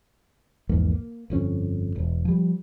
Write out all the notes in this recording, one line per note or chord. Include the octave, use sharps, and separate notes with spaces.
A#1 E2 G#2 A#3
A#3
G1 F2 C#4
E1
F3 G3